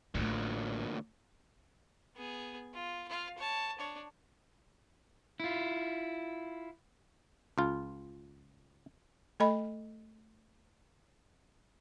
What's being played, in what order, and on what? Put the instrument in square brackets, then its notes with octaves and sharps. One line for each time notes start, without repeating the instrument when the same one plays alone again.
[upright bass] A1 A3 [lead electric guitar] D2 A#2
[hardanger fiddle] B3 G#4
F4
F4 F5
C#5 A5
D4 C#5
[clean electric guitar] E4 F4
[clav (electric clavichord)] C#2 F4
[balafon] A3 A4 D#5 B5